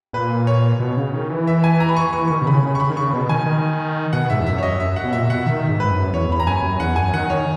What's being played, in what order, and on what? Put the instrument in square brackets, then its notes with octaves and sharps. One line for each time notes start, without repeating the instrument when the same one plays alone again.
[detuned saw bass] A#2 [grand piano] B4
[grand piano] C#5
[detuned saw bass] B2
C#3
D#3
E3
[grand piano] E5
G#5
A#5
B5
C#6
[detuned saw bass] E3 [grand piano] C#6
[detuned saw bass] D#3 [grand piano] C#6
[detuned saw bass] B2
[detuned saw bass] C#3 [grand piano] B5
[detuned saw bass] C#3
[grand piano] C#6
[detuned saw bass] C#3 [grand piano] B5
[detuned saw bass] D#3
[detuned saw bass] C#3 [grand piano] C#6
[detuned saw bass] B2
[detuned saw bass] D#3 [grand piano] G#5
[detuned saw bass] D#3
[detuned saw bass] B2 [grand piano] F#5
[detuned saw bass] G#2 [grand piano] E5
[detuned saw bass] E2
[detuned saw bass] F#2 [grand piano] E5
[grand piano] C#5
[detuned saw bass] F#2 [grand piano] D#5
[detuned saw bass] F#2 [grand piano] E5
[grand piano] F#5
[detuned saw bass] B2
[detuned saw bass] A#2 [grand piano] E5
[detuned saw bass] B2 [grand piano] F#5
[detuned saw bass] D#3 [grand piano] E5
[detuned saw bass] G#2
[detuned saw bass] G#2 [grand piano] B4
[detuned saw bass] F#2
[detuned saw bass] E2 [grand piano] C#5
[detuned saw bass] E2 [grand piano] B5
[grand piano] A#5
[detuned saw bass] F#2 [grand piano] G#5
[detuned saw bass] F#2
[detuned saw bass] E2 [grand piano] F#5
[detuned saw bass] F#2 [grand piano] G#5
[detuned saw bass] D#3 [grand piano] F#5
[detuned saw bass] D#3 [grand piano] C#5